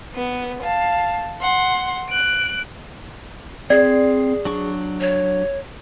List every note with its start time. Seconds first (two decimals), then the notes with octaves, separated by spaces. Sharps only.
0.14 B3
0.63 F5 A5
1.41 F#5 C6
2.09 F#6 D7
3.70 C4 G#4 D5
4.45 F#3 D4 C#6
5.01 C#5